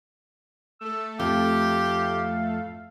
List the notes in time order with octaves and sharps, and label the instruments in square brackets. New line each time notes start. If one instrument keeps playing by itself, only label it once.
[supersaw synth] A3 A4 [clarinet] E6
[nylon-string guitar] F2 [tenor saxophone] G4 [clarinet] F5